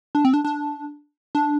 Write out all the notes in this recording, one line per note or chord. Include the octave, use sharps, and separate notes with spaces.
D4
C4
D4
D4
D4